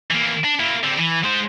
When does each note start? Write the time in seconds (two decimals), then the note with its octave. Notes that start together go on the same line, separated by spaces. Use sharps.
0.11 E3 A#3
0.44 D4
0.59 A#3 E4
0.83 D3 C4
0.99 E3
1.23 G#3 C5